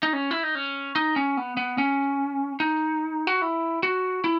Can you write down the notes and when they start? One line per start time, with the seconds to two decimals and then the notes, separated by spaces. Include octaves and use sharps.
0.03 D#4
0.13 C#4
0.31 E4
0.43 D#4
0.55 C#4
0.96 D#4
1.16 C#4
1.37 B3
1.57 B3
1.78 C#4
2.60 D#4
3.27 F#4
3.42 E4
3.83 F#4
4.24 E4